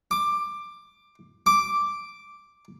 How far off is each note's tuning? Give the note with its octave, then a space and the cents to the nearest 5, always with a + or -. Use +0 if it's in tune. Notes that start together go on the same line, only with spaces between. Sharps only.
D6 +15
D6 +0